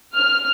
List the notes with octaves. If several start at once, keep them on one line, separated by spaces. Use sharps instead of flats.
F6